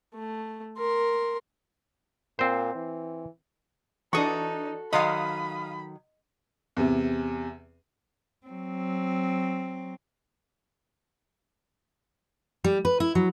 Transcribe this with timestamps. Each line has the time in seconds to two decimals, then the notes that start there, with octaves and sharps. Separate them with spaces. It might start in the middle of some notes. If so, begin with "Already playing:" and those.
0.14 A3
0.78 A#4 C6
2.39 A#2 C4 C5
2.75 E3
4.13 E3 D4 D#4 F#4 A4 C#6 D#6
4.93 D#3 F#3 D#5 F5 B5 C6 D#6
6.77 E2 C3
8.47 F#3 C4
12.64 G3
12.85 B4
13.00 E4
13.15 F#3